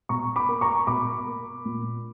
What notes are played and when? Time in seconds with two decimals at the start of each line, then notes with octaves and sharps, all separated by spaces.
0.09 B2 A#5 C#6
0.36 B5 D6
0.49 A#3
0.61 A#5 C#6
0.87 B2 B5 D6
1.27 A#3
1.65 A#2